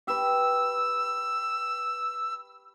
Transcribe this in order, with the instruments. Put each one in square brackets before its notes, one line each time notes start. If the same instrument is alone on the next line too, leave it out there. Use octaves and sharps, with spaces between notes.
[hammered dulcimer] G4 B4 D6 [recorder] E6